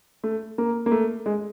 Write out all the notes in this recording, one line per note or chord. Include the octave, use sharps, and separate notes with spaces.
A3
A#3
A#3
A3
G#3